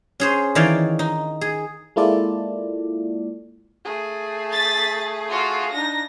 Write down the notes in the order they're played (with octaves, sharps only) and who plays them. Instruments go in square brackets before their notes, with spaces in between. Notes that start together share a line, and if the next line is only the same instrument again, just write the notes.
[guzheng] C#4 G#4 C5
D#3 E3 C#5 D5 F5
D#4
G#4
[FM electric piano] G#3 A#3 E4 F4 A4 D5
[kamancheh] A3 G#4
[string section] A6 B6
F4 F#4
[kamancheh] D4 D#4 [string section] A#6